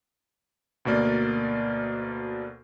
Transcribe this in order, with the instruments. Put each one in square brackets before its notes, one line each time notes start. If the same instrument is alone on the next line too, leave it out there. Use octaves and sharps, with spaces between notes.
[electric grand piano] D2 B2 A#3 D5